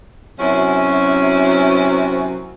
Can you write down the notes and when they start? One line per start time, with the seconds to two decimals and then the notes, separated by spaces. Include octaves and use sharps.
0.39 F#2 C3 C4 C#4 E4 F#4